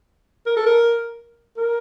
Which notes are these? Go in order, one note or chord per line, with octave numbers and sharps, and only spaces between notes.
A#4
A4
A#4
A#4